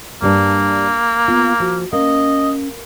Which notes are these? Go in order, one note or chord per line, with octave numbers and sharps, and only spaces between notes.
G2 G3 A#3 D4
B3 F4
F3 F#4
A#3 C#4 D#5